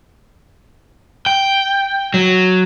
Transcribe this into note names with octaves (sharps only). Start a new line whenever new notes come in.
G5
F#3